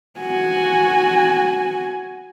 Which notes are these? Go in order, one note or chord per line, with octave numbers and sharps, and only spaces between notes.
F#4 G#5